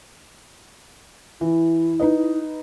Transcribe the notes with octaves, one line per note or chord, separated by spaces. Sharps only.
E3 E4
D#4 B4 D#5